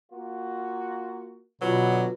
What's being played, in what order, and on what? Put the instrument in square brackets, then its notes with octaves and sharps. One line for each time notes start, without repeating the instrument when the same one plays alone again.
[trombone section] A#3 F4 F#4
[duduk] B2 [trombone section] D3 B3 [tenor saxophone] F#3 [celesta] F4 F#4 B4